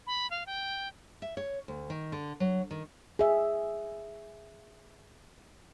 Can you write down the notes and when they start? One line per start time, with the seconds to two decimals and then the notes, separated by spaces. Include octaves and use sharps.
0.07 B5
0.30 F5
0.46 G5
1.22 E5
1.37 C#5
1.68 D2
1.90 D#3
2.12 D3
2.40 F#3
2.71 D#3
3.19 G#4 E5